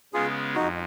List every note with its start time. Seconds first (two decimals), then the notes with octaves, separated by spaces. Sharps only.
0.14 C#3 G#3 B3 F4 G#4
0.55 F2 D#4 F#4